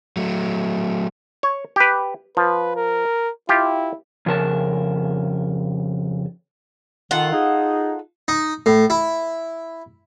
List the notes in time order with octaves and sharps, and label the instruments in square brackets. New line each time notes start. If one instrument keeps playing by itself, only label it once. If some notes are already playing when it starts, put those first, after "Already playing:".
[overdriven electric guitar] F#3 A3
[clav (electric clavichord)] C#5
G4 B4
[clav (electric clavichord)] F3 [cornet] B4
[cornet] A#4
[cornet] E4 [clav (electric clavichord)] F4 G4
[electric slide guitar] F2 C#3 A#4 A5
[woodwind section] D#3 [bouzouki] F4 A4 F#5
[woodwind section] D#4 G#4
[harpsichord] D#4
A2
E4